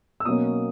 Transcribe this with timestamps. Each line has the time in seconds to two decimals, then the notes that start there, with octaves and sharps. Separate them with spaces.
0.20 E6
0.25 B2 F#3 A#3 C#4 D#6